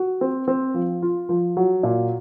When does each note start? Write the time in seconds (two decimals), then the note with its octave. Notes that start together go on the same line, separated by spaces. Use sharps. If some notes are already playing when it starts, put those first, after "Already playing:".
Already playing: F#4
0.21 C4
0.48 C4
0.74 F3
1.02 F4
1.29 F3
1.57 F#3
1.83 A#2